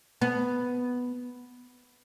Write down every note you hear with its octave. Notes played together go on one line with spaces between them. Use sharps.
B3